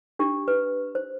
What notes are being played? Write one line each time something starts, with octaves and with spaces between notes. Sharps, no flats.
D4 G4
B4
C5